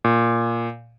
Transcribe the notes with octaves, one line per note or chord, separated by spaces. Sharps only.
A#2